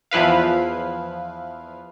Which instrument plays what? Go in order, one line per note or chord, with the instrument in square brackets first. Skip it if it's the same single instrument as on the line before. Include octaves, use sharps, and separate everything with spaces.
[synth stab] E2 F3 E4 B4 F5